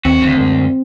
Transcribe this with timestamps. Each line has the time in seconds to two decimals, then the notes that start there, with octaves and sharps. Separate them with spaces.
0.05 D#2 C4 F#4
0.22 D#1 D2 G2
0.37 F#2 G#3 A#3